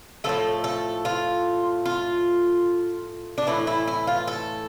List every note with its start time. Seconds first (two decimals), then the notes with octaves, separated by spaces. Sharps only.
0.24 A2 F3 A3 A4
0.64 A4
1.05 F4
1.85 F4
3.38 D4
3.47 A2 E3 A3 E4
3.67 E4
3.87 E4
4.07 F4
4.28 A4